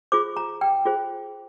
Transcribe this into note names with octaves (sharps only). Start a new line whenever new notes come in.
F4 G#4 C5 D6
A#5
G5
F4 G#4 C5